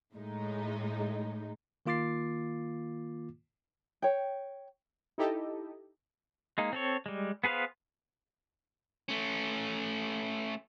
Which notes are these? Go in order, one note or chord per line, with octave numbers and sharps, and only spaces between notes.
A2 G#3 D#4
D#3 A#3 F4 D6 A6 C7
C#5 G5
D#4 E4 G4 A4 D#5
G#3 A#3 D#4
C4 A4 C#5
G3 G#3
B3 G#4 B4 C5 F5
A3 C#4